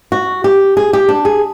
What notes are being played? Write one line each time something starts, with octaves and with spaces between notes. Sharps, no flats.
F#4
G4
G#4
G4
D4
G#4